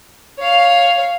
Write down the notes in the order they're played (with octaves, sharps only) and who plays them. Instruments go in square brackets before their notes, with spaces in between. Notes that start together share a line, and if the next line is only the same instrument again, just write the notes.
[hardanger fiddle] C#5 F5